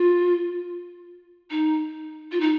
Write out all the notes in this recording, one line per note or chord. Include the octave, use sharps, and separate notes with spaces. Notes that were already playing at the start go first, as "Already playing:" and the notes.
Already playing: F4
D#4
F4
D#4